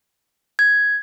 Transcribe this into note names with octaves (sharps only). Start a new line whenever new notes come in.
G#6